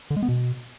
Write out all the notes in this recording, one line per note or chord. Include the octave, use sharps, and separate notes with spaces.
D3
G#3
B3
B2